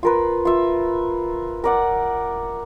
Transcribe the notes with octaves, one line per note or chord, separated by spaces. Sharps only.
F4 A#4 B4
F4 E5
A#4 D5 F#5